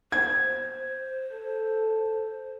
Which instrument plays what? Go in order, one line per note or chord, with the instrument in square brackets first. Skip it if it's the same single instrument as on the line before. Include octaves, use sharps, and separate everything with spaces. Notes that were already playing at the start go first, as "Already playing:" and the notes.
[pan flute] C5 [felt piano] G#6
[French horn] A4